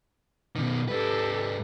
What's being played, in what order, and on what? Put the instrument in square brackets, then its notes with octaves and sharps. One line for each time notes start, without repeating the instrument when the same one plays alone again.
[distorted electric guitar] B2 D#3
[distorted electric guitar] G#2 B4 [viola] G4 A4